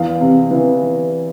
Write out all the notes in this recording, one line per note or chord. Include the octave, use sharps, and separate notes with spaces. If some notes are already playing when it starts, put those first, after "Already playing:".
Already playing: E2 F5
C3
E3